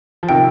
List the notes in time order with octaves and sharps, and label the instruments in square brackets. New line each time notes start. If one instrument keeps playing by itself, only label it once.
[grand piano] F3
[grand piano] C3 D#3 [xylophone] G5